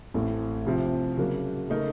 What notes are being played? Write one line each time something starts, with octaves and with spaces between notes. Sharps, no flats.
A1 A2 A3 C4
C3 F3 C4
C#3 F#3 A#3
C#3 A3 D#4 A#4